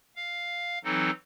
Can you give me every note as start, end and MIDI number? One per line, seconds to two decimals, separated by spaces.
0.16 0.79 77
0.84 1.11 52
0.84 1.11 54
0.84 1.11 60
0.84 1.11 63
0.84 1.11 69